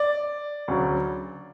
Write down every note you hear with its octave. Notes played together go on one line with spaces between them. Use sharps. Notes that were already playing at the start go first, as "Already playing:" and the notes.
Already playing: D5
D2 C#3 F#3